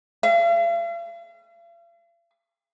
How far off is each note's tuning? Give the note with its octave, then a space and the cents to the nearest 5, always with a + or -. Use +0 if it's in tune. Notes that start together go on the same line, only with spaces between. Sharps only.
F5 -45